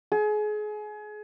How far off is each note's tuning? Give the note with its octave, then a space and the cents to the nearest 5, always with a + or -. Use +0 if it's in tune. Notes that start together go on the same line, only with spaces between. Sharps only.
G#4 +30